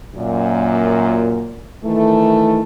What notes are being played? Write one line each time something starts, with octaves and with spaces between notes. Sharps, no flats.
F#2 A#2
D#3 E3 A3